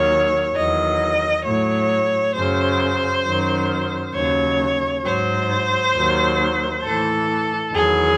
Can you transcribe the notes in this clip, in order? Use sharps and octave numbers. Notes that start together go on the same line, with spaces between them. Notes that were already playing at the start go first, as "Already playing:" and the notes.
Already playing: D#2 D#3 F#3 C#5
E2 D#3 F#3 D#5
A2 F#3 C#5
F#2 C#3 F#3 C5
F#2 D#3 F#3
D#2 C#3 F#3 C#5
G#2 F#3 C5
D#2 D#3 F#3
A2 E3 A4
E2 D#3 F#3 G#4